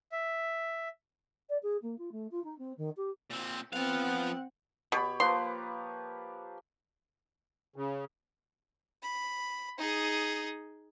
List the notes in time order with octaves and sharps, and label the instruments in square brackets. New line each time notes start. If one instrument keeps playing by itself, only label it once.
[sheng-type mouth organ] E5
[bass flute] D5
G#4
A#3
F4
A3
F4
D#4
C4
D#3
G4
[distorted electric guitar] A#2 C4
[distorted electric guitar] F3 F5 [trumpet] B3 [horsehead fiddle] C4 F#5
[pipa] B2 [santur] G4 C#5 B5
[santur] F3 A#3 B4 [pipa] C6
[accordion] C#3
[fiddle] B5
D#4 G#4